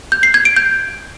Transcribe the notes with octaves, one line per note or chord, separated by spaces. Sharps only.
G6
C7
G#6
D7
G6